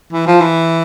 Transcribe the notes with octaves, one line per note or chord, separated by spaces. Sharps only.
E3
F3
E3